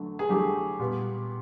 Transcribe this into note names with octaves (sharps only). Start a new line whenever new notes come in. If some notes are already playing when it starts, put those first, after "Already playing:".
Already playing: D3 F#3 A3
G#4
D3 F#3 A3 G4
A#2 G3 B3